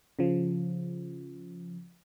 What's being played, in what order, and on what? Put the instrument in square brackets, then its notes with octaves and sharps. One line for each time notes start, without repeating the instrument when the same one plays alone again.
[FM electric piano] C#3 F3